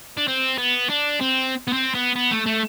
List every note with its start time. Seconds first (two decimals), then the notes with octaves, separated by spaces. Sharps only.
0.17 D4
0.28 C4
0.58 B3
0.90 D4
1.21 C4
1.67 B3
1.73 C4
1.95 B3
2.16 B3
2.31 A3
2.46 A3